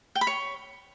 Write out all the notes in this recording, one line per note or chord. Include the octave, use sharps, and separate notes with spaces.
G5
B5
C#5